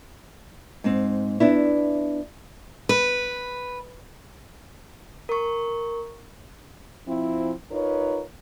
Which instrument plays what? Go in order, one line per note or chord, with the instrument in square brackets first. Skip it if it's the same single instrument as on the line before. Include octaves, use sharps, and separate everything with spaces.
[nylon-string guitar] G#2 C4
B3 D4 E4
[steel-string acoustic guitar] B4
[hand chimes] A#4 C#6
[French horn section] F3 C4 E4
D#4 F4 A#4 B4 C#5